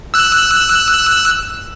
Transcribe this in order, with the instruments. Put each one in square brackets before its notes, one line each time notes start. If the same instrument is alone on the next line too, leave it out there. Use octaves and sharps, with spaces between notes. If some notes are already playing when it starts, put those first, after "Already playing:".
[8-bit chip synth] E6 F#6